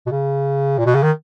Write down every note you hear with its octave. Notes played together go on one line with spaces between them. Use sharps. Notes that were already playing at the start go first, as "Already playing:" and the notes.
B2
C#3
A#2
B2
C#3
D#3